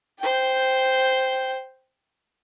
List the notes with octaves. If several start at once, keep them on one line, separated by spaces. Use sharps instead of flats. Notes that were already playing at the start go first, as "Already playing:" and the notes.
C5 G5